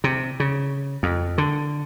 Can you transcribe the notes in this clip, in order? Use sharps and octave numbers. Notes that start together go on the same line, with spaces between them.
C3
C#3
F2
D3